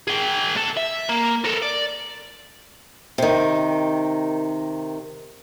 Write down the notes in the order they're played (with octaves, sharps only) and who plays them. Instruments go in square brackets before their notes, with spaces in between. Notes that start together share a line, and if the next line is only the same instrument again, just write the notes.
[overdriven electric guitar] G#4 G5
C2 A4
E5
A#3
A4 A#4
D5
[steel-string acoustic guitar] C3 D#3